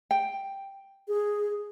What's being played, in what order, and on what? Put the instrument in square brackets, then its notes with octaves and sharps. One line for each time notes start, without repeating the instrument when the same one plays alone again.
[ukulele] G5
[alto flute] G#4